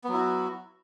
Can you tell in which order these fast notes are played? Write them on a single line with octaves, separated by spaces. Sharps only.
B3 F#3 E4 F#4